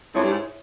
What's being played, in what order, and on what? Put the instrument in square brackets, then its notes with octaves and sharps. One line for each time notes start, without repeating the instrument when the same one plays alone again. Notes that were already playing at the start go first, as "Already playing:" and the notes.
[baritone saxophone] F2 [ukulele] E4 G#4 C#5
[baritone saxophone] G2
G#2